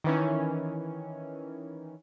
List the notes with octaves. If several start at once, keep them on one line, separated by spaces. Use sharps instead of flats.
D#3 E3 C#4